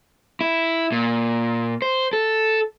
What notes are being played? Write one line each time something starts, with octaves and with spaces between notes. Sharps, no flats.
E4
A#2
C5
A4